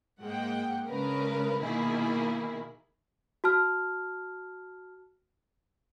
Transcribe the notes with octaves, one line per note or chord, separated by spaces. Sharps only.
G#2 G#3 A#3 F#5 G5
C#3 G#3 D4 A#4 B4
B2 D#3 A#3 E4 G#4
F#4 A5 F6